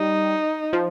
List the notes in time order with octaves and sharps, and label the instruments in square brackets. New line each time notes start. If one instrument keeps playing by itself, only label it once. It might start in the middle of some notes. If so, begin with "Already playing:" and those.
Already playing: [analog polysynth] G3 [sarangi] D#4
[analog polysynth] F3